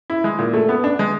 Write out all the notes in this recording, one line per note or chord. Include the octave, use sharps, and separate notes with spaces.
E4
G#3
A#2
A3
B3
D4
G#3